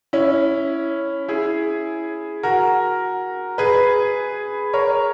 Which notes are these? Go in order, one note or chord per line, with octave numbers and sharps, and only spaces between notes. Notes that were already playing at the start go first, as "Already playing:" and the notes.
C#4 E4
E4 G#4
F#4 A#4
G#4 B4
A#4 C#5